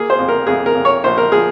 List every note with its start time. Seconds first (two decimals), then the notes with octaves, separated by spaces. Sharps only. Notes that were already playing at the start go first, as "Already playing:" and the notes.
Already playing: A#3 G#4
0.10 C5
0.19 F2
0.29 A#4
0.47 F2 G#4
0.66 A#4
0.75 F2
0.85 C#5
1.04 A#1 C5
1.18 A#4
1.31 F3 G#4